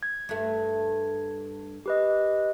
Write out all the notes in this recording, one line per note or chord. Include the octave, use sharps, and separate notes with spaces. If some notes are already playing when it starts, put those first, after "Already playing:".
G#6
G2 A3
G4 B4 D#5